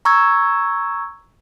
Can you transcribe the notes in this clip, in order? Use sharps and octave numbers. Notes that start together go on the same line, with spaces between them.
A#5 C#6 E6 G#6